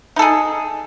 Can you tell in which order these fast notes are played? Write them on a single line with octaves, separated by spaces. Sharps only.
D#4 A4 G#4